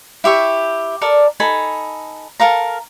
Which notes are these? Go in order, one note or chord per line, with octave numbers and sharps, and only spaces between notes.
E4 G4 E5 C#6
A4 A#4 D5
D#4 A4 G#5 B5
A4 A#4 F5 A#5